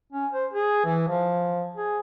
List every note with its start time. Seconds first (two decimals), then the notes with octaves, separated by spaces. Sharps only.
0.12 C#4
0.33 C5
0.54 G#4
0.85 E3
1.08 F3
1.76 G#4